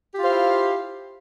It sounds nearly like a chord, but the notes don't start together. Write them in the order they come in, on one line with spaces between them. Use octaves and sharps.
G4 F4 C5 F5 E4